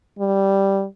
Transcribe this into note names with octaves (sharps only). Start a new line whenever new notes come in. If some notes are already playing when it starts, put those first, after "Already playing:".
G3